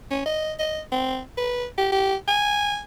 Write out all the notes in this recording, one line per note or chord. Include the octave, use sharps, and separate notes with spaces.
C#4
D#5
D#5
C4
B4
G4
G4
G#5